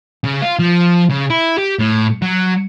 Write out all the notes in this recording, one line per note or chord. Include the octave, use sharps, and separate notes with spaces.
C#3
F4
F3
C#3
E4
G4
A2
F#3